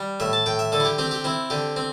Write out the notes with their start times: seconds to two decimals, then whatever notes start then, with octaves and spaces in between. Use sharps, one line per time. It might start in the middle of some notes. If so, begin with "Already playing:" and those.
Already playing: G3
0.20 A2 E5
0.33 A5
0.46 A2 G5
0.59 E5
0.72 D3 A4
0.80 E4
0.85 G4
0.98 C4 G4
1.11 G4
1.24 C4 E4
1.50 D3 G4
1.76 C4